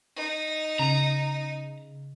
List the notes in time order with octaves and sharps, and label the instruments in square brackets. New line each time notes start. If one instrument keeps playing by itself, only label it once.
[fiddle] D#4
[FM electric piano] C#3 [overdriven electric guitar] A#5